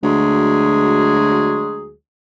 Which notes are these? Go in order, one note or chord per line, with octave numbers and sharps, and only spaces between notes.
D2 F#3 G#3 G#4